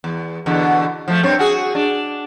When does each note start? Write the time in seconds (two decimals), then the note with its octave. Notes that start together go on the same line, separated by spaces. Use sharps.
0.04 E2
0.46 E2 B2 D3
1.08 F3 A3
1.23 G2 C4 C#5
1.39 F#4 G#4
1.75 D4